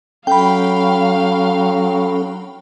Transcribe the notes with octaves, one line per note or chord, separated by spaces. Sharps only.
F#3 C#4 A4 F5 G5 B5